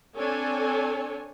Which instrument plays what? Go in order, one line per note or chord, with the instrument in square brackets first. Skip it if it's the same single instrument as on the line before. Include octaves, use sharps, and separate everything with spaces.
[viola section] C4 D4 A4 C#5 G#5